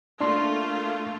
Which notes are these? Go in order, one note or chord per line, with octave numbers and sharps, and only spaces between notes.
A3 A#3 D4 F4 C6